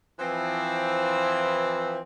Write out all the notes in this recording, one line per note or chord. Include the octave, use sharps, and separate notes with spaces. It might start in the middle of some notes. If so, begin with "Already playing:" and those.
E3 F3 C4